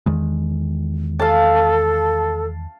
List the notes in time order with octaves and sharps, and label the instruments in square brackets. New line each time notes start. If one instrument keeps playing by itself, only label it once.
[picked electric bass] E2 D#3 G#3
[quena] A4 [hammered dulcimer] F5 A5